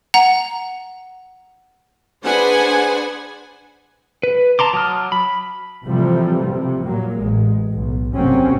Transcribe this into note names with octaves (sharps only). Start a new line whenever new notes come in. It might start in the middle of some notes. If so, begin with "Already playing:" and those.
F#5 A#5
D4 G#4 B4 C5 F#5 G#5
B4
A5 A#5 C6 D6
F#3 A5 D6 D#6 F6
B5
C3 E3 F3 G3 A3
C3
A#2 F#3 A#3
A1 G#3
B1
G1 C3 F#3 A#3 C4 C#4